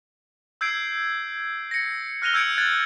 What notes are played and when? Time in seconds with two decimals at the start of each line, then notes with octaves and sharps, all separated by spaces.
0.61 E6 G6 G#6 C7 D7
1.71 A#6 C#7
2.22 F6 F#6 A#6 D#7 F7 G7
2.34 E6 G6 G#6 C#7 D7
2.58 F#6 G#6 A6